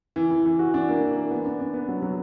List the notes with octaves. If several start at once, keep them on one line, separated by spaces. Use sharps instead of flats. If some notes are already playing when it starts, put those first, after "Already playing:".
E3
E3
E3
F#4
D4
A#3
E3
A#3
B3
D4
D4
B3
F#3
F#3